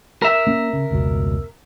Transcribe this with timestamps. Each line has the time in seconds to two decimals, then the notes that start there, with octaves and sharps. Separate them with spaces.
0.22 A#4 E5
0.47 A#3 C#4
0.73 C#3
0.91 F1 C#2 B2